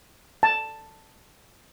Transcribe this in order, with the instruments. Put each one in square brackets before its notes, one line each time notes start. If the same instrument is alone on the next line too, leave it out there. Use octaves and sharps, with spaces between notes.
[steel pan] A5